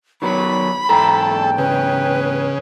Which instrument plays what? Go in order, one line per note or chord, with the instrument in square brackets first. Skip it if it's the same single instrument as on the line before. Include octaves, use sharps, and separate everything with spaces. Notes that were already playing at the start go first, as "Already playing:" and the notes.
[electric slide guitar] D#3 F#3 B3 [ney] B5
[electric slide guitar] E2 G#2 A#5 [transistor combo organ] A4 [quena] G5
[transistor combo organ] C#3 [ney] B4